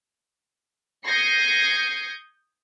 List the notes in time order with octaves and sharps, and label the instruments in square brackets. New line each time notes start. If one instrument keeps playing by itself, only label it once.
[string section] D#6 G6 G#6 A#6 C7 C#7